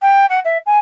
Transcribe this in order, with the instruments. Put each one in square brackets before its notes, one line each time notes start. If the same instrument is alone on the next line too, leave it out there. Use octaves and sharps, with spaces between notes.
[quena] G5
F#5
E5
G#5